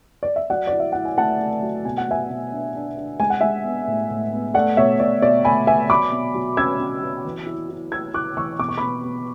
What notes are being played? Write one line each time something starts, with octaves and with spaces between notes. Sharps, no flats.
D5
E5
F#3 D5 F#5
D5
E4
E5
E4 F#5
G#5
A3 F#5 A5
A3
F#3
B2 G#5
F#5
B2 E5 G#5
B2
D4
D4
D4
G#3 G#5
F#5
G#3 E5 G#5
B3
A2
A2
B3
A3 D5 F#5
B2 C#5 E5
B2 D5
B2 D5
A3 G#5 B5
B2 E5 G#5
F#3 B5 D6
B2
F#3
C#4 E6 G#6
C#4
F#3
E3
E4
E4
E4 E6 G#6
E4 D6 F#6
E3 C#6 E6
B2 D6
C#6
B2 B5 D6
B2